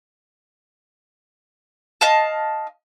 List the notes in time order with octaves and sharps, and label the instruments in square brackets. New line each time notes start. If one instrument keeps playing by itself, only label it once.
[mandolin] D#5 F5 A5